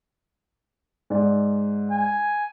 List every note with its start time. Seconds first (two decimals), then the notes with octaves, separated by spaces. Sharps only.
1.10 G#2 D5
1.91 G#5